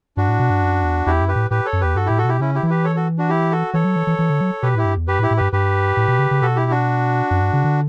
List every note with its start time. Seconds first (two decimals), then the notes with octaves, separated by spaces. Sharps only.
0.17 G2 D4 F#4
0.29 A2
0.39 B2
0.50 G2
0.62 F#2
0.84 E2
1.06 E2 E4 G4
1.21 F#2
1.28 G4 B4
1.36 A2
1.50 A2 G4 B4
1.65 A4 C#5
1.73 F#2
1.81 E2 G4 B4
1.95 G2 F#4 A4
2.06 A2 E4 G4
2.18 F#4 A4
2.25 B2 E4 G4
2.40 C#3 C#4 E4
2.55 E4 G4
2.63 E3
2.70 G4 B4
2.84 A4 C#5
2.96 F#4 A4
3.18 D4 F#4
3.29 E4 G4
3.51 F#4 A4
3.74 E3 A4 C#5
3.85 F#3
3.96 E3
4.07 E3
4.19 E3
4.30 D3
4.41 F#3
4.63 B2 G4 B4
4.75 A2 E4 G4
4.85 G2
4.97 E2
5.08 F#2 G4 B4
5.19 A2
5.23 E4 G4
5.31 A2
5.37 G2 G4 B4
5.52 G2 G4 B4
5.97 A2
6.08 B2
6.19 C#3
6.31 C#3
6.42 B2 F#4 A4
6.56 E4 G4
6.71 D4 F#4
7.31 F#2
7.41 G2
7.53 C#3
7.64 D3